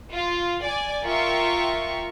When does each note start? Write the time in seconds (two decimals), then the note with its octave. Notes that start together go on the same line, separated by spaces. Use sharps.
0.13 F4
0.63 D5 G#5
1.03 F4 A#4 E5 G5 C#6